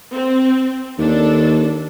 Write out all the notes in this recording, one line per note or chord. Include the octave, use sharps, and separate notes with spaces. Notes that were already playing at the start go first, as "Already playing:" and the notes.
C4
D#2 D4 A4